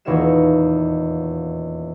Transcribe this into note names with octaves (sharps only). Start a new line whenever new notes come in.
D#1 E2 D#4 C#5 F5 E7